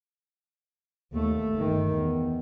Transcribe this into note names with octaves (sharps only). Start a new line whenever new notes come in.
D#2 A3
G1 D#3
E2